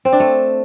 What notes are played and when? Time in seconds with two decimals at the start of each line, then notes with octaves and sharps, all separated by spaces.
0.05 C4
0.13 D4
0.20 A3